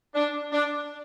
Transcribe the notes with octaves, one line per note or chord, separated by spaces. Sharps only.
D4
D4